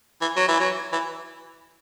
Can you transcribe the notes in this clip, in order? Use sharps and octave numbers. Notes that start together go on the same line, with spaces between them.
E3
F#3
E3
F#3
E3